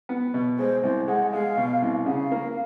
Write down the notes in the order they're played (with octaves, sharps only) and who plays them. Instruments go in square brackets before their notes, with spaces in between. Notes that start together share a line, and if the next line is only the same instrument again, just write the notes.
[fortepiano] B3
B2
[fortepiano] G#3 [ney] C5
[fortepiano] C2 [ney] C5
[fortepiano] G#3 [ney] F#5
[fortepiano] G#3 [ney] F5
[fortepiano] B2
C2
[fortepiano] C#3 [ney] F#5
[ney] F5
[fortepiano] A#3